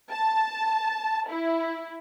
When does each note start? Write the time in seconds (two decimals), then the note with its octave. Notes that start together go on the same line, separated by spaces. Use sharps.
0.12 A5
1.30 E4